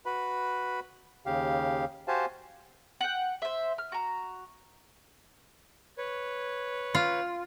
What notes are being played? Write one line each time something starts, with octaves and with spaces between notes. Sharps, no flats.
F#4 B4 B5
D#2 C#3 G4 F5
F#4 G4 C5 F5 G#5 A5
F#5 G5
C5 E5
F6
F#4 A#5
B4 C#5
F4